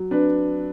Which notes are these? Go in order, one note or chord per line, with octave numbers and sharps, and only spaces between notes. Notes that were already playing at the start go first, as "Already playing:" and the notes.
Already playing: F#3
D4 B4